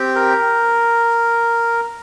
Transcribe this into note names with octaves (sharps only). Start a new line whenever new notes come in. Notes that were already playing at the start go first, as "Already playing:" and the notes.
Already playing: C4 G4
A#4